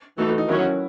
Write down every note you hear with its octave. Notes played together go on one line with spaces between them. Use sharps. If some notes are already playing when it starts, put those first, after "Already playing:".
E3 A3 D#4 F#4 A4
F#4
D#4
D#3 F#3 C#4 E4 F#4